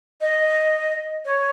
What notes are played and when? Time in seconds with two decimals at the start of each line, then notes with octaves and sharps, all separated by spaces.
0.21 D#5
1.25 C#5